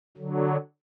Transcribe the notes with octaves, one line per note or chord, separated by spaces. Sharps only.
D3 F#3